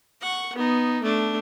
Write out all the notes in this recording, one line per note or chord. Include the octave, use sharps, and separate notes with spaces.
F#5 C#6
B3 D#4
A3 D4